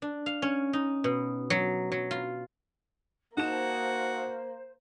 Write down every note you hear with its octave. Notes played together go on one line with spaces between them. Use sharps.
D4
F5
C#4
D#4
B2
F#3
F#3
F4
A#3 D#4 F#4 C5 A5 E7